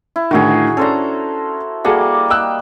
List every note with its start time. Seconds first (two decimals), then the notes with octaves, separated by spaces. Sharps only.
0.16 E4
0.31 A2 D3 D#3 E4 F#4 G#4
0.77 C#4 D4 A4 C5 A#5
1.85 G3 A#3 F#4 G#4 A4
2.30 D#5 G5 E6 F#6